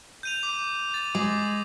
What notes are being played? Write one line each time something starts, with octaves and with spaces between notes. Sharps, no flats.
G6 D#7 F7
D6
A6
G#3 D6